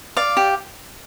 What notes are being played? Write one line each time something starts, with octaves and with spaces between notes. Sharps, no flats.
D5 F5
G4